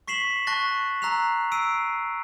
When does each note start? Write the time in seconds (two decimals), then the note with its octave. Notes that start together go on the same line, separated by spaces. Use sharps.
0.07 C#6 B6 C7 E7 F#7
0.47 A5 C#6 F#6 A6 A#6
1.02 A#5 E6 F#6 C7 F7
1.52 E6 C7 D7 D#7